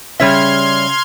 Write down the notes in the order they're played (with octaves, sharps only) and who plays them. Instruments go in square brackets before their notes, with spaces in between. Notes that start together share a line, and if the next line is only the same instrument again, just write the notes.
[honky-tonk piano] C#3 [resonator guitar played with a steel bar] G3 C#5 E5 [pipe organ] C6 F6 G#6